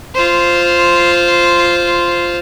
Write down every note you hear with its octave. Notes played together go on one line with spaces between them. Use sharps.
F4 C5